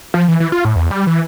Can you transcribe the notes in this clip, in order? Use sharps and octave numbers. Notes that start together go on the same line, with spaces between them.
F3
E3
E3
F4
A2
E2
G3
E3